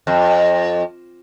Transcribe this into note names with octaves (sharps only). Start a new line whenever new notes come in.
F2